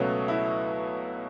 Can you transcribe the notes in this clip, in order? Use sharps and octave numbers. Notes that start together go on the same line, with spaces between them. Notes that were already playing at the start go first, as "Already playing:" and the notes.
Already playing: C#2 B2 F#3 A3 C#5
E4